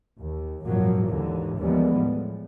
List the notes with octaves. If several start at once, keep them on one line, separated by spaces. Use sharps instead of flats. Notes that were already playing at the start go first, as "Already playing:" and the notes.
D#2
G#1 F#2 A#2 F3 F#3 A#3
D#2 G#2 D3 E3
D#2 E3 F3 G3 G#3 B3
A2